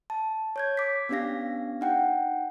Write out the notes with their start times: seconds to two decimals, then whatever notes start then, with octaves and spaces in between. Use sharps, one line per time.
0.10 A5
0.56 C#5 G6 G#6
0.77 D6 B6
1.09 B3 C#4 D4 G4 F5 A#6
1.81 D#4 F#5 G5